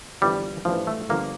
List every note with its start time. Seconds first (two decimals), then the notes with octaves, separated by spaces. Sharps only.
0.21 G1 F2 E3 G3
0.65 A1 G2 E3 F3
0.87 A3
1.09 G1 F2 D3 F3 A#3